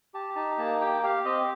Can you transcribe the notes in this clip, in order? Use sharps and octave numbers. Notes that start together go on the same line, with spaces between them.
G4 A5
D#4 A5
A#3 A5
G4 G5
G4 F5
C4 D#5